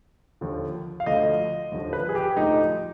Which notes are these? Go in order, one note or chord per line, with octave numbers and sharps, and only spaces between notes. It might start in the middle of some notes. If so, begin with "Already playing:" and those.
D#2 D3 F3
F5
D2 D3 F3 D#5
D#2 D3 F3
B4
G#4
G4
D2 D3 F3 D#4